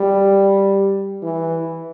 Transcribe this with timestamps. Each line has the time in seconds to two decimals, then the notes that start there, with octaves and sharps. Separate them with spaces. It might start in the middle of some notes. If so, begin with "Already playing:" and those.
Already playing: G3
1.23 E3